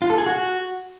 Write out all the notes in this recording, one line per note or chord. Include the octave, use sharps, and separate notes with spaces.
F4
A4
G#4
F#4